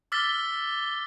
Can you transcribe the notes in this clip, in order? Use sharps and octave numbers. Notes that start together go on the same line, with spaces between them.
D6 E6 F6 A6 B6 G7